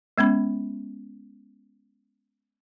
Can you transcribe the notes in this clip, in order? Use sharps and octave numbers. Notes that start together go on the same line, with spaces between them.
G#3 B3 C#4 B5